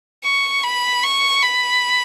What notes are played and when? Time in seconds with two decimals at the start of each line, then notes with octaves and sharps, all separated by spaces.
0.24 C#6
0.64 B5
1.04 C#6
1.43 B5